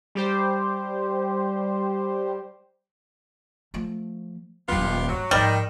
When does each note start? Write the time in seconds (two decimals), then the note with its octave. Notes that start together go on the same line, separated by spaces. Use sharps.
0.15 G3 G4 C5
3.74 F3 A3
4.69 D#1 F#3 B3 F4 G4
5.09 G2 F#3
5.31 G#2 D#3 F3 G3